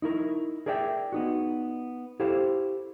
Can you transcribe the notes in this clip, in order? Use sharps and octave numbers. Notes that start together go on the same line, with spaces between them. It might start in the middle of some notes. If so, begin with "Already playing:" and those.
D#4 E4 A#4
G#4 A#4 D5 E5 G5
B3 D#4 F#4
E4 G4 A4 C5 F5